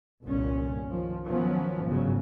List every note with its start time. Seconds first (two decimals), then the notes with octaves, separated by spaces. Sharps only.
0.24 G1 C2 A#2 C#4
0.90 D#3 F3
1.26 D#3 F3 F#3 B3 C#4
1.86 G1 G#2 C#3 F#3